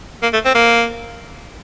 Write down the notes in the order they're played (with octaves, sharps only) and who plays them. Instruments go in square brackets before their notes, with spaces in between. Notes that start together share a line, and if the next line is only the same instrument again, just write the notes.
[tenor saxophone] A#3
A3
C4
A#3